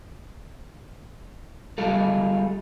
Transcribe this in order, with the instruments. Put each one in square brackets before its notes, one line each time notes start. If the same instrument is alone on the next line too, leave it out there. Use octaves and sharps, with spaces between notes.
[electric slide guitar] G3 G#3 F4 A4